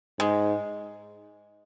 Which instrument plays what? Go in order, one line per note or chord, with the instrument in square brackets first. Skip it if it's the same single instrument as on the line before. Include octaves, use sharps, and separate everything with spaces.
[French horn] G#2 [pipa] G#3